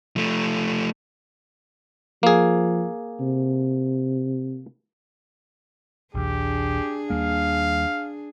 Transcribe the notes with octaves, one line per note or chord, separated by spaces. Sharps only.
F3 A3
F3 A#3 G#4
C3
A#1 D#2 D4 G4 G#4
D#2 G3 A#3 F5